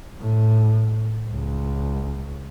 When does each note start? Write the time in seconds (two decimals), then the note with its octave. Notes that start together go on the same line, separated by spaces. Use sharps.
0.20 A2
1.29 C#2